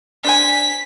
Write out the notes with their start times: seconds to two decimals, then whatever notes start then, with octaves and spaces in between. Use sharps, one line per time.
0.25 D4 C5 G#5 B6